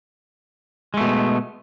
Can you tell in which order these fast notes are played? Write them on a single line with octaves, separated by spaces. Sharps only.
G#3 A3 B2